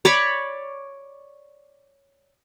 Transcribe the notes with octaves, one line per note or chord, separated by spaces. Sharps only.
C#5 D5 B5 C#6